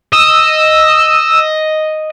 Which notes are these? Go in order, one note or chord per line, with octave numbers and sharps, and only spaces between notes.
D#5 E6